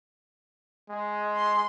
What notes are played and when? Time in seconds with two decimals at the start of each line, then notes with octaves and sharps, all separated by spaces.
0.90 G#3
1.36 C6